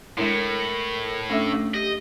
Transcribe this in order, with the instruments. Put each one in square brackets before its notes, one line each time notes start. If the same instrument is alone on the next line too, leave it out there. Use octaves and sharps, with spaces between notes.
[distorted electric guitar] A2 [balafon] G#3 D4 E4 [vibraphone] A#4
[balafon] A3 A4 E5 [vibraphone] C#4 D4 E6
[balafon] A3
[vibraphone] G4 [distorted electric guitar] D#5